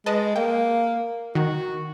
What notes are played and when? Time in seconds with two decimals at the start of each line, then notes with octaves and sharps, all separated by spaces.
0.06 G#3 B4 D#5 A5
0.36 A#3 G5
1.35 D#3 F#4